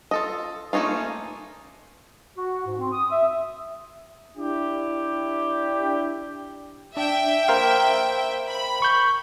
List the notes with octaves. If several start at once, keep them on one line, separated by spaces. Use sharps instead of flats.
F4 A4 D#5
A3 A#3 C#4 D#4 F4
F#4
G#2
C4
D#6
E5
D4 E4 G4
D4 E5 G5
A#4 C5 F5
B5
C#6 G6